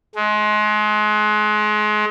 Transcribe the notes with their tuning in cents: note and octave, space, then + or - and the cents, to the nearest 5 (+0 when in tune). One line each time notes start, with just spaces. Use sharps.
G#3 +30